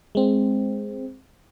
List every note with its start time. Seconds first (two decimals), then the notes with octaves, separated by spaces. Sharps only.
0.15 G#3 C4